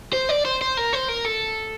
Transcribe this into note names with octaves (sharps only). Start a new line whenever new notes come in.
C5
D5
C5
C5
A#4
C5
A#4
A4